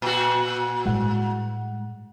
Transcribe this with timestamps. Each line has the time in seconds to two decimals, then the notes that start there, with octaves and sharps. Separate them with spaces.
0.02 A#2 F#4
0.86 A2 G3 G#3 F#5